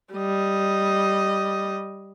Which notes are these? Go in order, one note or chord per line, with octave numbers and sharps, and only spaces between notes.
G3 D#5